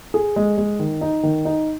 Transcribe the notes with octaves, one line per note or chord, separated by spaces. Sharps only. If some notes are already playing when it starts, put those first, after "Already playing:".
G#4
G#3
G#3
D#3
D#4
D#3
D#4